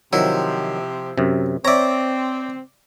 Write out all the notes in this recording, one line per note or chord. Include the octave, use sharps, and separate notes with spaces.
C3 D#3 F3 F#3 E4
F#2 C3
C4 C#5 D5 E5 A#5